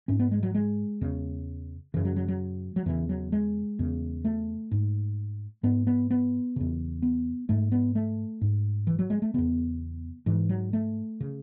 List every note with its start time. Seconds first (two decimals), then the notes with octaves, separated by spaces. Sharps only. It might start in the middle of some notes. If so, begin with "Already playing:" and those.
0.08 G#2 C#4
0.19 B3
0.31 G#3
0.43 F#3
0.55 G#3
1.01 E2 C#3
1.94 F#2 C#3 E3
2.05 F#3
2.16 F#3
2.28 F#3
2.76 F#3
2.86 E2 C#3 E3
3.09 F#3
3.32 G#3
3.79 E2 C#3
4.25 A3
4.72 G#2
5.63 G#2 B3
5.87 B3
6.11 B3
6.56 E2 C#3
7.02 B3
7.49 G#2 A3
7.72 B3
7.95 A3
8.41 G#2
8.87 E3
8.99 F#3
9.10 G#3
9.22 A3
9.34 E2 C#3 B3
10.26 G#2 E3
10.49 F#3
10.73 A3
11.21 C#3